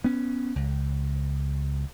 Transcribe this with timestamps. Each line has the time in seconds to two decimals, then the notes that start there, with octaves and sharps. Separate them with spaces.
0.04 B3 C#4
0.56 C#2